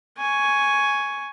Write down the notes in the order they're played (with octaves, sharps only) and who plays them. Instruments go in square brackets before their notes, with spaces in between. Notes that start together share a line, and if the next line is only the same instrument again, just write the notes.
[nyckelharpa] G#5 C#6